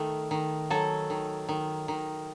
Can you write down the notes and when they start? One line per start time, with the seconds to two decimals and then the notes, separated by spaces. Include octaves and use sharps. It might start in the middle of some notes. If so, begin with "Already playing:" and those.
Already playing: D#3 A3
0.31 D#3
0.70 F#3 A4
1.10 D#3
1.49 D#3
1.88 D#3